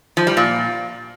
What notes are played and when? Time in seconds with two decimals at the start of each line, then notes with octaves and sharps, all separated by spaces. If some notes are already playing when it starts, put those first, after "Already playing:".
0.17 F3
0.27 G3
0.37 A#2